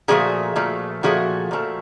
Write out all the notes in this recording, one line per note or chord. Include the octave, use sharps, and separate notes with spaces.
A#2 F3 A3 F#4 G#4
A#2 F3 A3
A#2 F3 A3 F#4 G#4
A#2 F3 A3